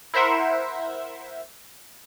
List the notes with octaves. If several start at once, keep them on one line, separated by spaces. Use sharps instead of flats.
E4 A#4 C5 E5 F#5